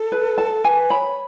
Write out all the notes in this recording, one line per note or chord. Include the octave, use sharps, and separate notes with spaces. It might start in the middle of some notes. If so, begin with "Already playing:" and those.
Already playing: A4
B4
A5
B4 G#5
C#5 B5